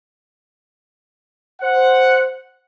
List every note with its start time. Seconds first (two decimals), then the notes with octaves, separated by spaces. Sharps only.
1.62 C5 F#5